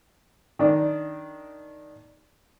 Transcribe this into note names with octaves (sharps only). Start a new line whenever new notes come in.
D#3 D4